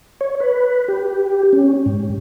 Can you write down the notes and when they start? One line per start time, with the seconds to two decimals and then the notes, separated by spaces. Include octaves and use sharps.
0.21 C#5
0.40 B4
0.88 G4
1.53 C#4
1.86 G#2